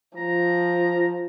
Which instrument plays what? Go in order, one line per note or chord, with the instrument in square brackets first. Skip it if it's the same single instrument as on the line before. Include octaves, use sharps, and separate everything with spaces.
[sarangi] F3 [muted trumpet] A#5